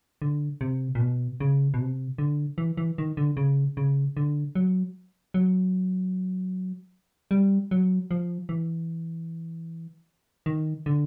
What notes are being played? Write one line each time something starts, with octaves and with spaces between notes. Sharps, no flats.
D3
C3
A#2
B2
C#3
B2
C3
D3
E3
E3
D#3
D3
C#3
C#3
D3
F#3
F#3
G3
F#3
F3
E3
D#3
D3